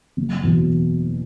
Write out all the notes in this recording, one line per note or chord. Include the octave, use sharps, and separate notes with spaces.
F#1
E2 B2